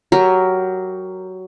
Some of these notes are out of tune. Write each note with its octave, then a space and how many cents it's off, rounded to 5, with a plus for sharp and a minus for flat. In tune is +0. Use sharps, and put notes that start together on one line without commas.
F#3 +10 G4 +0 A#4 +0